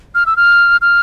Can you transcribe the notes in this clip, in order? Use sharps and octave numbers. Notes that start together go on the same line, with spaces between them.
F6
E6
F6
F6